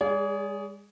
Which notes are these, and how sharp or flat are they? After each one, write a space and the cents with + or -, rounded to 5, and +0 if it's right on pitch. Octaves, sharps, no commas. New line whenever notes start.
G#3 -40 G#4 +0 D5 -45